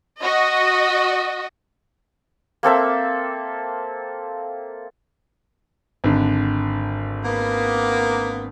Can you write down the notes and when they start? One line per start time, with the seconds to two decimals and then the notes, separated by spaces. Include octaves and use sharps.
0.21 F#4 D#5
2.63 A#3 C4 A4 E5
6.04 G#1 D3
7.25 A#3 B3